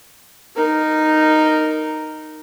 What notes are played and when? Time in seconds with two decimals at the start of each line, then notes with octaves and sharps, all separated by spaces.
0.56 D#4 A#4